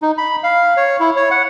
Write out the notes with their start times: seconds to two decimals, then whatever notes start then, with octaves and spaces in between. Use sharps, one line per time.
0.02 D#4
0.18 B5
0.43 F5
0.77 C#5
1.00 E4
1.16 C#5
1.31 F#5